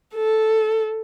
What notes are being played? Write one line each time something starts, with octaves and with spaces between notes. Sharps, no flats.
A4